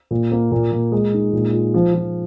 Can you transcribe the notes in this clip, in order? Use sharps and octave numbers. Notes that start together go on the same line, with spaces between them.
A#2
A#3
A#2
A#2
G#3
D#4
A#2
F4
F3
F3